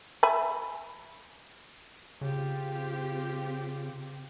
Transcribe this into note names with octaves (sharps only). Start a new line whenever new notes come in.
E5 G#5 B5
C#3 C4 F4 G4